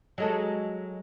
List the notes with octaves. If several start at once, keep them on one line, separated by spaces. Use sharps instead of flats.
F#3 G#3 A4